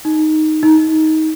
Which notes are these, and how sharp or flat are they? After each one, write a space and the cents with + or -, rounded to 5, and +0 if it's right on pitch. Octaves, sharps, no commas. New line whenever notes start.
D#4 +0
D#4 +20